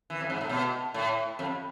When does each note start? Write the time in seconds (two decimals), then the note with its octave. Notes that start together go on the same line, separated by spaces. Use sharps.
0.10 E3
0.21 F2
0.30 G#2
0.41 A2
0.49 B2
0.94 A2
1.39 F2